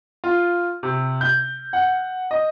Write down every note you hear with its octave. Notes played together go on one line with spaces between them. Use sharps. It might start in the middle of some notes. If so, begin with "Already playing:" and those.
F4
C3
G6
F#5
D#5